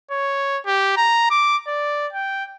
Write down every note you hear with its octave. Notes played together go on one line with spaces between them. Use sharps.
C#5
G4
A#5
D6
D5
G5